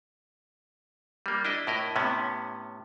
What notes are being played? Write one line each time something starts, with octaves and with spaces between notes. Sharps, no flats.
G3 A#3
D4 E4 D#5
A2 E4 A#4 D#5
A2 C3 B3 C#4